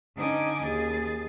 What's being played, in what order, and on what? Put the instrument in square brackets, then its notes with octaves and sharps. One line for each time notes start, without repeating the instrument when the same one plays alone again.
[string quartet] D3 C#4 D#4 D#5 G#5 D6
D#2 G#4 A6